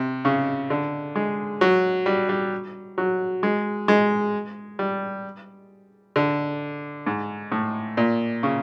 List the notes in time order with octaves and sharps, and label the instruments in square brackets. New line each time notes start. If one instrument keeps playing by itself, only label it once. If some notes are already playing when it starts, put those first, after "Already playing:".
Already playing: [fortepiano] C3
C#3
D3
G#3
F#3
G3
G3
F#3
G#3
G#3
G3
D3
G#2
A2
A#2
C#3